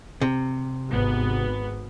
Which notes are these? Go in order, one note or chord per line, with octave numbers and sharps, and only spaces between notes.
C3
G#1 B3